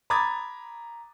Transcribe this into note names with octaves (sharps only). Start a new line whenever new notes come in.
A#5 B5 D6 D#6 G#6 A6